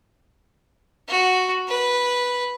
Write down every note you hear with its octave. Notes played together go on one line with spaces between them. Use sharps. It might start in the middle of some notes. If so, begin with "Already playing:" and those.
F#4
B4